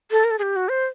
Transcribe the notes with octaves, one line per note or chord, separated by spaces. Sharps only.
A4
A#4
A4
G#4
G4
F#4
C5